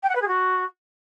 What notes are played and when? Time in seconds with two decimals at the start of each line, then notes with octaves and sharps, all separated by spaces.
0.03 G5
0.09 F#5
0.15 B4
0.22 G#4
0.28 F#4